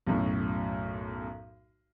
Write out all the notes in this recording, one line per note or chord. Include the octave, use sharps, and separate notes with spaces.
B1 F#2 A2